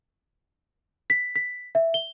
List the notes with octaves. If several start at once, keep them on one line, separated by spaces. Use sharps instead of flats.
B6
B6
E5
G7